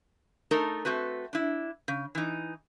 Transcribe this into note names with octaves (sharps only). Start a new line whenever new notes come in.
A3 D#4 A4 A#4
A3 C4 F#4 B4
D4 E4
C#3
E3 D#4